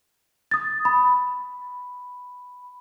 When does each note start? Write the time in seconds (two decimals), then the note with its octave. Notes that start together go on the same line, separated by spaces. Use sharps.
0.51 D#6 A6
0.85 B5